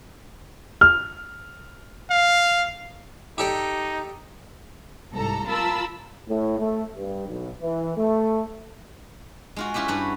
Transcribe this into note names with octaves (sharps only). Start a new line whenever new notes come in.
F6
F5
D#4 G4 A4 D5
C2 G#2 A4 A#5
F4 A#4 A5 B5 E6
A2
A3
G2
B1
E3
A3
G#3 F4 F#4
C#4 E4 F4 G4 B4
G2 F#4 B4